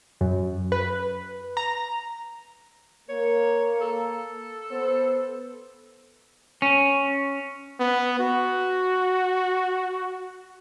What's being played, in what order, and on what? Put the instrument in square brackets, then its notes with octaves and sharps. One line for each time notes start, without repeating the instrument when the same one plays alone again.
[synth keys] F#2
B4
A#5
[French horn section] A#3 A#4 [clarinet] C#5
[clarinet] A4
[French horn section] B3 C5
[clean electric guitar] C#4
[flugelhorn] B3
F#4